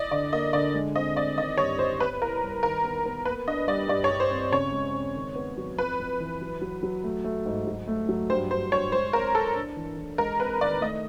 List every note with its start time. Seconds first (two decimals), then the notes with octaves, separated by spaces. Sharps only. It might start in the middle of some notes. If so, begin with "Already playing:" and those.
Already playing: D5 D#5
0.11 D3 D5
0.32 A#3 D#5
0.53 D3 D5
0.74 G#3
0.95 C4 D#5
1.16 C4 D5
1.37 D#3 D#5
1.58 G2 C#5
1.79 G3 C5
2.00 B3 B4
2.21 E4 A#4
2.42 G3
2.63 D#3 A#4
2.84 B3
3.06 B3
3.25 A#3 B4
3.47 D4 D#5
3.67 G3 D5
3.88 G2 D5
4.04 C#5
4.10 G2
4.20 C5
4.31 C4
4.52 C#3 C#5
4.72 G#3
4.94 C4
5.15 D#3
5.36 B3
5.57 F#3
5.78 F2 B4
5.99 F2
6.20 E3
6.41 F#3
6.61 F#3
6.83 F#3
7.04 A3
7.24 A3
7.46 G#2
7.67 F#3
7.87 A3
8.09 F#3
8.29 G2 C5
8.51 G2 C5
8.72 G2 C#5
8.92 G#3 C5
9.13 C4 A#4
9.35 C4 A4
9.56 D4
9.77 E3
9.98 E3
10.18 G#3 A#4
10.40 C4 B4
10.61 D#3 D5
10.81 A3 D#5